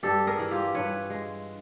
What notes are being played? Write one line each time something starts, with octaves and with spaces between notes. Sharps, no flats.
G2 G4 A4
G#4 A#4
E3
F4 G4
G2 B4 C#5
G#3